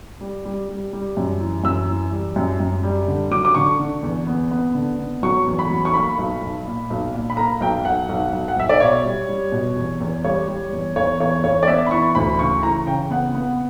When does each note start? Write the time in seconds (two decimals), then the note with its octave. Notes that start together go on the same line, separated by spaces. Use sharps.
0.21 G3
0.45 G3
0.68 G3
0.93 G3
1.17 F#2
1.40 E3
1.64 F#2 E6
1.89 E3
2.11 G3
2.36 F#2
2.60 F#2
2.83 G3
3.08 D3
3.31 F#3 D6
3.45 D6
3.55 D3 C#6
3.79 D3
4.03 E2
4.27 B3
4.51 B3
4.75 D3
4.99 B3
5.23 F#3 C#6
5.47 E2
5.59 B5
5.70 F#3
5.85 C#6
5.94 A#3 B5
6.19 B1
6.42 B1
6.66 A#2
6.90 B1
7.14 A#2
7.30 B5
7.37 A#3 A#5
7.61 B1 G5
7.85 B1 F#5
8.09 B1
8.33 B1
8.48 F#5
8.56 B1 E5
8.69 D5
8.80 B2 C#5
9.05 G3
9.29 G3
9.52 B2
9.76 E2
10.01 E2
10.24 G3 C#5
10.48 G3
10.73 E2
10.96 E2 C#5
11.20 E2 C#5
11.43 E2 C#5
11.63 D5
11.67 B3 E5
11.87 B5
11.91 E3 C#6
12.15 D2 B5
12.39 C#3 C#6
12.63 E3 A#5
12.87 C#3 G5
13.10 B3 F#5
13.34 B3